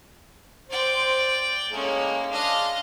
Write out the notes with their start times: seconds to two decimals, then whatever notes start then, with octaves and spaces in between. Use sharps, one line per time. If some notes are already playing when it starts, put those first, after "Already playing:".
0.70 C5 D5 G5
1.72 A2 G#3 A#3 C#4
2.32 G#3 D4 D#5 F5